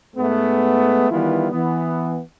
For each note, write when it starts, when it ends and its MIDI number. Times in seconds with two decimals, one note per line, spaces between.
0.16 1.07 44
0.16 1.07 56
0.16 1.07 57
0.16 1.07 59
1.11 1.49 51
1.11 1.49 52
1.11 1.49 55
1.11 1.49 59
1.11 1.49 64
1.11 1.49 65
1.51 2.20 52
1.51 2.20 59